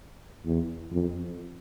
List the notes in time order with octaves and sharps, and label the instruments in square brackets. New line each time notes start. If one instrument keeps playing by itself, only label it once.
[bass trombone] E2
F2